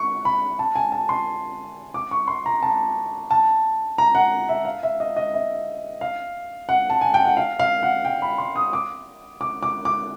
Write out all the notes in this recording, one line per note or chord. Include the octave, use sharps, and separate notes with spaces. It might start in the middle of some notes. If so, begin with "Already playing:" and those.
Already playing: C#6
B5
A5
G#5
A5
C6
D6
C#6
C6
A#5
A5
A5
A#5
F#5
E5
F5
E5
D#5
D#5
E5
F5
F#5
A5
G#5
G5
F#5
F5
F5
F#5
G5
B5
C6
D#6
D6
D6
D6
D6